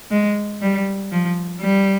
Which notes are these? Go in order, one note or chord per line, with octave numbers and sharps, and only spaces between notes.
G#3
G3
F3
G3